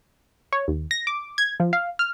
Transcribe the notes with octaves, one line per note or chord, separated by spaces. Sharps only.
C#5
D#2
A#6
D6
G#6
F3
F5
F6